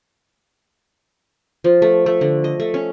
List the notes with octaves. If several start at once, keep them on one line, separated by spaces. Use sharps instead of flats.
F3
A3
A3
D3
D#5
A3
C#4